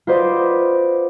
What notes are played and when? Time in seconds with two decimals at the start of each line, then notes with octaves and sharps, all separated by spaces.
0.07 F4 F#4 B4 C5 D5 D#5